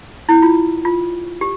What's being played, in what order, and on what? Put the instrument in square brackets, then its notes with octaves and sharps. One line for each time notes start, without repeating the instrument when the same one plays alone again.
[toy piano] E4
F4
F4
G4